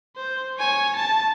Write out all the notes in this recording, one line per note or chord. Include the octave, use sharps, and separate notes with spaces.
C5
C#5 G#5
A5